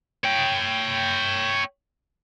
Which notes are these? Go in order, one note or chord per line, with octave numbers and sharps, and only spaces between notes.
C#5 G5